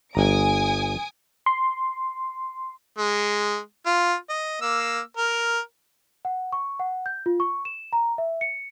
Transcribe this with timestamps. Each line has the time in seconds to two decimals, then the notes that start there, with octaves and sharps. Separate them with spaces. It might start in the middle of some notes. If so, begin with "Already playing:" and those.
0.15 G1 G#5 A#5 D#6 D7
1.46 C6
2.98 G#3
3.86 F4
4.30 D#5
4.62 A#3 E6
5.17 A#4
6.25 F#5
6.52 C#6
6.80 F#5
7.06 G6
7.26 F4
7.40 C#6
7.65 E7
7.93 A#5
8.18 E5
8.41 C#7